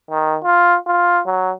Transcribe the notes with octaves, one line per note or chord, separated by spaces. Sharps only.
D#3
F4
F4
F#3